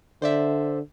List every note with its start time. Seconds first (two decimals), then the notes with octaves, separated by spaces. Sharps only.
0.22 D3 C5 D5 E5